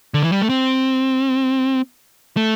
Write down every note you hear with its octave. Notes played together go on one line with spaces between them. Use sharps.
D3
E3
G3
A3
C4
A3